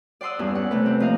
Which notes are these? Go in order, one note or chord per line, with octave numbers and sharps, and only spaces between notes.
D5 F#5 C6 D#6 E6
E2 G2 C#4
F#5
C3 A3 B4
C4
F3 A#3 D#5 F5